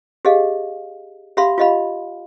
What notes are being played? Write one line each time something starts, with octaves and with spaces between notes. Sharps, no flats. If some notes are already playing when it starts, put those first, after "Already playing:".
G4 G#4 D#5 F5
G4 E5 F5 B5 C6
F4 G4 D#5 F5 B5